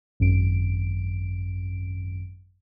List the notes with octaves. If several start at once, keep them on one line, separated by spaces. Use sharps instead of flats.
G#1 F#2 D7